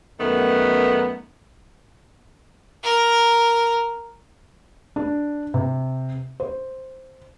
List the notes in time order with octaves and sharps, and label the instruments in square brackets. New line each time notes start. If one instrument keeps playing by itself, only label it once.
[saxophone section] F#2 D#3 A3 B3
[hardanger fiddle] A#4
[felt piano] D4
C3
C5